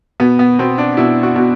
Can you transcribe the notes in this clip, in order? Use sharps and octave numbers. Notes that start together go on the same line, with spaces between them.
B2 B3
B3
B2 C4
D4
B2 E4
F#4
B2